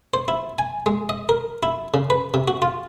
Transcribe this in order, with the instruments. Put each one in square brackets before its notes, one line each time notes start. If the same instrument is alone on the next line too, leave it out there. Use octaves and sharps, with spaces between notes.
[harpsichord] C5
E4
G#5
G#3
D#5
A#4
E4
C#3
B4
C3
F#4
F4